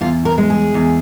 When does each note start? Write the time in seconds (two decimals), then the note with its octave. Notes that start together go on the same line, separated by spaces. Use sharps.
0.01 E2 F4
0.25 A#4
0.38 G#3
0.50 G#4
0.74 E2